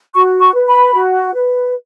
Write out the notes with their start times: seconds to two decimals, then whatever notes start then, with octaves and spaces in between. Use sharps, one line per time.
0.14 F#4 C#6
0.41 C#6
0.54 B4
0.68 B5
0.94 F#4
1.34 B4